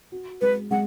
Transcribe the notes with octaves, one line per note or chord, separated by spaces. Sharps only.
F#4
G#3 B4
G#3 F#5